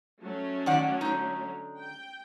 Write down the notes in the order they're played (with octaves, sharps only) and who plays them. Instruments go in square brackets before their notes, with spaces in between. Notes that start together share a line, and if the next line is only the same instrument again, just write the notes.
[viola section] F#3 A3 C#4
[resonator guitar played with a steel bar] D#3 D5 F#5
D3 D#4
[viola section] G5